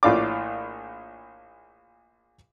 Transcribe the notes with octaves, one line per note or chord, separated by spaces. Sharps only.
A#1 A2 F4 D5 D6